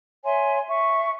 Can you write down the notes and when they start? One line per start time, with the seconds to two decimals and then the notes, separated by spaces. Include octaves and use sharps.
0.25 C#5 E5 G#5 C6
0.68 E5 C#6